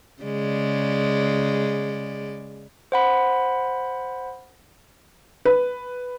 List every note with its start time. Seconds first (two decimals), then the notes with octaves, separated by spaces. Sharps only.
0.23 C#3 G#3 D5
2.92 C5 F#5 B5
5.45 B4